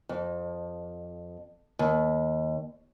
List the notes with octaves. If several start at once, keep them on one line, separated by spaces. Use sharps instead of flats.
F2
D#2